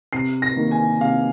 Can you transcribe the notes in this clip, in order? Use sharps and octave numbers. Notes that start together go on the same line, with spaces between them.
C3 C7
A#6
D#3 A#3
G#5
C3 F5